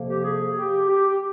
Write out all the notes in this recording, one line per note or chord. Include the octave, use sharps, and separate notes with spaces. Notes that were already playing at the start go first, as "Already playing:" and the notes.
Already playing: F2 C3 F3 A#3
G4
G#4
G4
G4